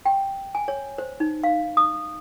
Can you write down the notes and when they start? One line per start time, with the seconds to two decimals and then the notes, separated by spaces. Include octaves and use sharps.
0.05 G5
0.55 G#5
0.68 C#5
0.98 C5
1.20 D#4
1.44 F5
1.77 D#6